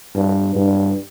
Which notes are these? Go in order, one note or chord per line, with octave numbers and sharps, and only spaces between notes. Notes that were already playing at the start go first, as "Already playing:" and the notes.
G2
G2